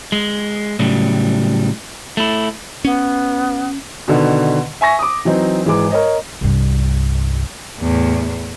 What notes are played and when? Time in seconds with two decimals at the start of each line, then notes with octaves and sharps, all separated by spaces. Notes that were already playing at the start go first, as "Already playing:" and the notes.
0.12 G#3
0.79 A2 C#3 F#3 G3
2.17 A3 E4
2.85 B3 C#4
4.08 B2 D3 D#3
4.81 E5 G#5 C#6 A#6
4.99 D6 D#6
5.25 E3 F#3 C4 D#4
5.65 G#1 E3 G#3 D6
5.91 A#4 C#5 D#5
6.41 C2 G2
7.80 E2 A2